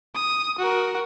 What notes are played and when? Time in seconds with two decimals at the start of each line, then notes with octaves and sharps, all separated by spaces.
0.15 D#6
0.58 F#4 A#4